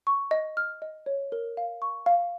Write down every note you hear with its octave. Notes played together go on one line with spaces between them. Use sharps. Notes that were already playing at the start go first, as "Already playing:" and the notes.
C#6
D#5
F6
D#5
C#5
A#4
F5
C#6
F5